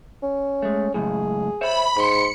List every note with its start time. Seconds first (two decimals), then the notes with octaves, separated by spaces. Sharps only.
0.23 C#4
0.62 G#3 A3
0.94 C#2 F#2 A2 G#4
1.61 C5 C#5 E5 B5
1.97 G#2 B5 C6 C#7